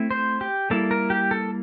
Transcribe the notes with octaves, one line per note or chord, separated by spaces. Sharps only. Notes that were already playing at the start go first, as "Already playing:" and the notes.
Already playing: A3 C4 E4
C5
G4
G3 A#3 E4 A4
A#4
G4
A4